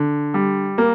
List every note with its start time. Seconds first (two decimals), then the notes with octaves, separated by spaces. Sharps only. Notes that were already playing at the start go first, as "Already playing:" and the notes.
Already playing: D3
0.34 G3
0.78 A#3